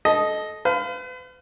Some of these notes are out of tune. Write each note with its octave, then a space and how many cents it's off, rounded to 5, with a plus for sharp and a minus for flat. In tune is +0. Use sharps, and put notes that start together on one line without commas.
A4 -20 D#5 +0
B4 +40 F5 +0